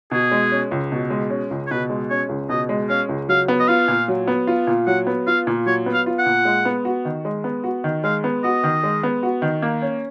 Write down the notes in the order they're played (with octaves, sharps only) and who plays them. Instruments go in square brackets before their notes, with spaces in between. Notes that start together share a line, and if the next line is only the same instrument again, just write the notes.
[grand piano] B2 [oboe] G#4
[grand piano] G#3
C#4
C#2
B2
G#3
C#4
C#2
[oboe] C#5
[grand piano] B2 [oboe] B4
[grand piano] G#3
[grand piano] C#4 [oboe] C#5
[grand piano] C#2
[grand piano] B2 [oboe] D#5
[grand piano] G#3
[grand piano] C#4 [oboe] F5
[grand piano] C#2
[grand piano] F#3 [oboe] F5
[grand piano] B3
[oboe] D#5
[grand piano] F4 [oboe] F5
[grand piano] A#2
F#3
B3
F4
A#2
[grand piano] F#3 [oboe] F#5
[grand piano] B3
[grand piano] F4 [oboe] F5
[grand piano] A#2
[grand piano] F#3 [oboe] C#5
[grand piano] B3
[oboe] F5
[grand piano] F4
[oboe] F#5
[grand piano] A#2
G#3
B3
F#4
D#3
G#3
B3
F#4
D#3
[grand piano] G#3 [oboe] F5
[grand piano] B3
[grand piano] F#4 [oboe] D#5
[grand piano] D#3
G#3
B3
F#4
D#3
A#3
C#4